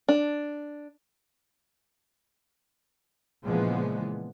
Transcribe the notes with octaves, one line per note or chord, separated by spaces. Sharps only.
D4
A#2 C#3 E3 F3 G#3 B3